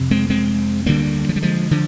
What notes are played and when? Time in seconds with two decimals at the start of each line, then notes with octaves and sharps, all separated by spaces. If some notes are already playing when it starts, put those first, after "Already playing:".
Already playing: F2 C3
0.11 G#3 C4
0.30 G#3 C4
0.86 D2 D3 G3 A#3
1.29 F3
1.36 G3
1.42 F3 G#3
1.71 D3 F3